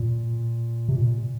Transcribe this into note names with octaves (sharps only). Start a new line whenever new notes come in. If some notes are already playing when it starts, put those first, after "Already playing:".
Already playing: A#2
C3
A#2